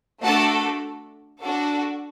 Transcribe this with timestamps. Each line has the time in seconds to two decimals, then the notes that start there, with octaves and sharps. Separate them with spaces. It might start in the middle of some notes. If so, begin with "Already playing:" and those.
0.23 A3 D4 F#4 A4 F#5 A5
1.40 D4 F#4 A4